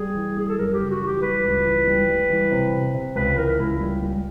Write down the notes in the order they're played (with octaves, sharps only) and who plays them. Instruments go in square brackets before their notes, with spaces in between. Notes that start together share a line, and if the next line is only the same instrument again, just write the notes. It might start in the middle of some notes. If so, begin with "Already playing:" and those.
Already playing: [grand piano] G3 [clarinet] G#4
[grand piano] E3
[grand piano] G3 [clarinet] G#4
[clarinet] A4
[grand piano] F#2 [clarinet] A#4
[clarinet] G4
[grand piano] C#3
[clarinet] F#4
[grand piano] E3 [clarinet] G4
[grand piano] G3 [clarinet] B4
[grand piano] C#2
E3
G3
G3
E3
C3
C3
C3
[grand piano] C#2 [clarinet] B4
[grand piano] E3 [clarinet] A#4
[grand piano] C#2 [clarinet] E4
[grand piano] G3
G3